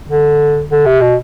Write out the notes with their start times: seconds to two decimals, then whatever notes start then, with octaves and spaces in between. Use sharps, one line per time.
0.09 D3
0.70 D3
0.86 C3
1.01 B2